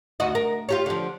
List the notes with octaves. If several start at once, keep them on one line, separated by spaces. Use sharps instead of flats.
D2 F#4 D#5
A#4
F4 G4 C#5
D3 F3